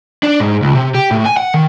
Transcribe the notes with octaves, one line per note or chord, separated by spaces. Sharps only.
D4
G#2
C#2
C3
G4
A2
G#5
F#5
D#3